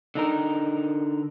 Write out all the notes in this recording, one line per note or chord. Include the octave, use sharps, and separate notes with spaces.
D3 D#4 A#4